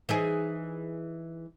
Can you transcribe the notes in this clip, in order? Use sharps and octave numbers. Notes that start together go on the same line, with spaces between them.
E3 D#4 G#4